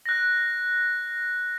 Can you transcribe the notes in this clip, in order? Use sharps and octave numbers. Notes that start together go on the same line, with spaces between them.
F#6 A#6